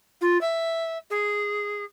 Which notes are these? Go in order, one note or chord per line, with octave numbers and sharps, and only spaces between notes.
F4
E5
G#4